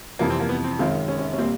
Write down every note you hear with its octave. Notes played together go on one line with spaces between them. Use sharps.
F2 C3 E3 G3 A#3
C4
A#3
B3
C4
F#2 D#3 G#3 C4 C#4 F4
C#4
C#4
C#4
A#2 G3 A#3 C4